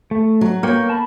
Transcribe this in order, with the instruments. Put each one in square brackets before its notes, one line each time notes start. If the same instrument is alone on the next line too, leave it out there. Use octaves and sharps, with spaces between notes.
[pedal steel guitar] A3
[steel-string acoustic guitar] F#3
[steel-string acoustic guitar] A#3 [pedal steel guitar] A#4 C#5 G5
[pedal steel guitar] A5 B5